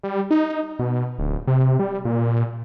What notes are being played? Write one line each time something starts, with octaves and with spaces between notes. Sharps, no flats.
G3
D#4
B2
D1
C3
G3
A#2